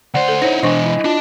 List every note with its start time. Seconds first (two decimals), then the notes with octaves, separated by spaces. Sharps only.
0.14 D2 C5 D5 F#5
0.28 A4
0.42 D#4 E4 C5 C#5
0.63 B2 E3 D4 C5 D#5 C#6
0.85 E4 D#5
1.05 D4 F4 A5